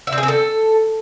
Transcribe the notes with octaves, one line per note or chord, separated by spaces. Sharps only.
E5
C4
G#4
C4
A4